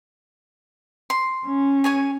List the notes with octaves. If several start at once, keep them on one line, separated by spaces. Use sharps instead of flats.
C6
C#4
G#4 C#5 G#5